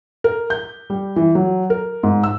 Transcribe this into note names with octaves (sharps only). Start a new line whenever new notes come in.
A#4
G6
G3
E3
F#3
A#4
G#2
E6